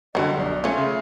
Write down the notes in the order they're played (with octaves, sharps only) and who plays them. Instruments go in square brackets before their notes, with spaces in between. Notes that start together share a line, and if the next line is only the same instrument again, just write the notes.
[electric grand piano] F#2 D3 [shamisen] F#3 G3 [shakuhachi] D#5
[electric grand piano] B1 [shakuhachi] D5
[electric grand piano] A3 [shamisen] C#4 F4 [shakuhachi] E5
[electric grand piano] C#3